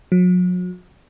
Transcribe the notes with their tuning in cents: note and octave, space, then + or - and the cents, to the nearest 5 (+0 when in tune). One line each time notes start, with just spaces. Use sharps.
F#3 -40